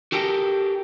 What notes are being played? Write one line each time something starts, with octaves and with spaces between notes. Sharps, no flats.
F#4 G4 A4 A#4 G5